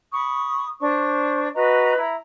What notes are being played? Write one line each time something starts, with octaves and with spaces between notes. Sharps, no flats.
B5 C#6 D#6
D4 C5 C#6
F#4 B4 D#5 A#5
E4 A#5 B5